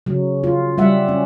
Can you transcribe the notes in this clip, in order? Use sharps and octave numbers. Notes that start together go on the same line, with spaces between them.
C#3 F#3
F4
G3 E5 F#5
C#4